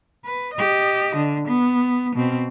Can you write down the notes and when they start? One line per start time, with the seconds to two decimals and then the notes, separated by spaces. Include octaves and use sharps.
0.25 B4
0.54 G4 D#5
1.16 D3
1.48 B3
2.16 B2 C4